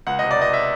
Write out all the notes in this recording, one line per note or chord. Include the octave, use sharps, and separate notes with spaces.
C#2 F#5
C3 D#5
D5
C#2 D#5
E5